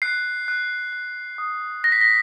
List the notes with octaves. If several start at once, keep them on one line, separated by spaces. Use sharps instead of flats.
F#6 C7
F#6
F#6
D#6
F#6 A#6
B6
A#6